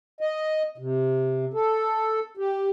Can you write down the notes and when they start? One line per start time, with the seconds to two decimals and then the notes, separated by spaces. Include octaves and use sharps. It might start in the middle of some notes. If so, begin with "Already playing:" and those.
0.21 D#5
0.78 C3
1.54 A4
2.37 G4